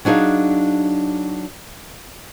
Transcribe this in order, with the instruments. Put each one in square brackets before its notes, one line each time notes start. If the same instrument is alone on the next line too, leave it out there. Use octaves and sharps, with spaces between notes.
[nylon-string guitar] F#3 D4 D#4 G#4 F5